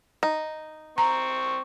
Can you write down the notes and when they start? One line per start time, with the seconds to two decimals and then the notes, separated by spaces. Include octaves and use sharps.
0.23 D#4
0.98 C4 A#5 C#6